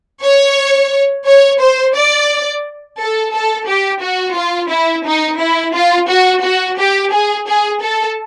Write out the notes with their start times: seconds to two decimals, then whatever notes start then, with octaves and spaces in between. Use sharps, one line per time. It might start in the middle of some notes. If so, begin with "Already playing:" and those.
0.23 C#5
1.27 C#5
1.61 C5
1.96 D5
3.00 A4
3.35 A4
3.69 G4
4.04 F#4
4.37 F4
4.72 E4
5.06 D#4
5.41 E4
5.75 F4
6.10 F#4
6.44 F#4
6.80 G4
7.14 G#4
7.48 G#4
7.83 A4